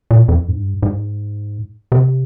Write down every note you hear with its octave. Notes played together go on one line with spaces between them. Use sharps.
A#2
F2
G#2
G2
G#2
C3